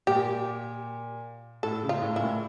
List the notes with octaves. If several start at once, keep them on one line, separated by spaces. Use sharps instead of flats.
A#2 G4
A2 A4
C#3
F4
A2
A#2 E4
A2